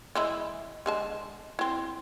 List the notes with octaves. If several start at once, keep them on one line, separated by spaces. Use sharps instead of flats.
E3 G#3 E4
D3 G#3 A5
C4 E4